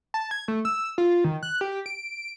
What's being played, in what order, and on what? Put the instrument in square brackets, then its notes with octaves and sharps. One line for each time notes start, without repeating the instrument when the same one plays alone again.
[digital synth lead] A5
G#6
A3
E6
F4
D#3
F#6
G4
D7